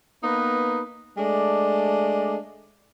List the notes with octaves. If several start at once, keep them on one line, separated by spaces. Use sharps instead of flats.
A#3 B3 D#4 B4
G#3 A3 D4 D5